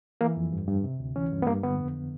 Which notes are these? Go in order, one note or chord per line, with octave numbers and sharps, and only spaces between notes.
E3 A#3
F2
G2
G2
C3
D2
E3 C#4
G2
B3
G2 A#3
D3 B3
F2